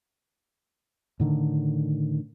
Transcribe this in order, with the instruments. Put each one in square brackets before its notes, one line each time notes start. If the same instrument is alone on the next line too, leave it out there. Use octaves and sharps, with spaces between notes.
[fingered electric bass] A2 D3 D#3